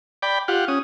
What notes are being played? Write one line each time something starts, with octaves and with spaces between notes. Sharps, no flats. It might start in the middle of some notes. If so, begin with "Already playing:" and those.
D5 G5 B5
F4 G4 F#5
C#4 D#6